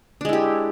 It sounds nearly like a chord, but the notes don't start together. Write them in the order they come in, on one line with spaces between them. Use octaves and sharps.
D4 G#3 E4 G4